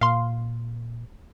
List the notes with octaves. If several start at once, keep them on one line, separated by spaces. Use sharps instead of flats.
A#2 F5 C6